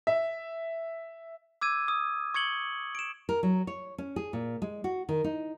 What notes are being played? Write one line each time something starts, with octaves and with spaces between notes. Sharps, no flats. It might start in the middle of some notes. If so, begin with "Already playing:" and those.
E5
D6 E6 G#6 D#7
D#6
C#6 G#6 C#7 F#7 G7
D7 E7
A#4
F#3
C#5
C#4
G#4
A#2
G#3
F#4
D#3
D#4